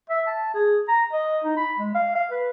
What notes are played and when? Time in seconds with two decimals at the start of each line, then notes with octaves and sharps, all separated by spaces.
0.10 E5
0.27 A5
0.54 G#4
0.88 A#5
1.13 D#5
1.44 D#4
1.57 B5
1.78 G#3
1.94 F5
2.15 F5
2.31 B4